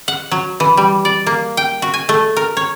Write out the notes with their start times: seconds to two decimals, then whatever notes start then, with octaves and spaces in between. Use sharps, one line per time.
0.08 F#5
0.31 F#3
0.60 E3
0.77 G3
1.05 D5
1.27 A#3
1.57 G5
1.82 F#4
1.94 G#5
2.09 A3
2.36 A#4
2.57 C#5